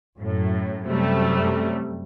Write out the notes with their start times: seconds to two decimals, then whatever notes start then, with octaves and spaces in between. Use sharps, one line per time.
0.19 F#2 A2
0.88 F#2 C3 G3 A3